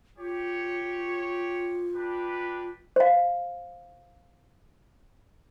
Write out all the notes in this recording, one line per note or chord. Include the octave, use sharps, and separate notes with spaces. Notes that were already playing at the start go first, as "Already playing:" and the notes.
F4 G4 C#5
D4 G4 B4
C5 F5